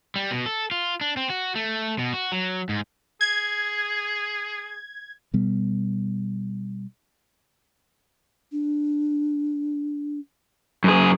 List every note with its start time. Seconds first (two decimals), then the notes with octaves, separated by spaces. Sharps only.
0.16 G3
0.31 B2
0.46 A4
0.71 F4
1.01 D4
1.17 C4
1.30 F#4
1.56 A3
1.99 B2
2.14 F#4
2.32 F#3
2.69 G#2
3.21 G#4 G#6
5.34 B2 G3 B3
8.52 D4
10.84 F#2 G#4